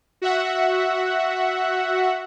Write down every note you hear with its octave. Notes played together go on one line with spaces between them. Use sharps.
F#4 E5 F#5